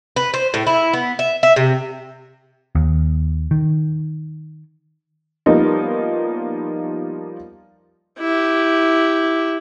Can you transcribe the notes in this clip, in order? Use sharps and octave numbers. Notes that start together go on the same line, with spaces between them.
B4
C5
A2
E4
B3
E5
E5
C3
D#2
D#3
F3 G3 A#3 B3 D#4
E4 G4